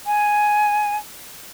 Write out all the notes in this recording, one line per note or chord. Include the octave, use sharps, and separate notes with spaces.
G#5